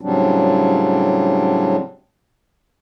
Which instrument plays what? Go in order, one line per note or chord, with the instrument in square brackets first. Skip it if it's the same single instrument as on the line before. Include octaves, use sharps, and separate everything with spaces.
[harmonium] A2 C#3 F#3 G3 C4 D4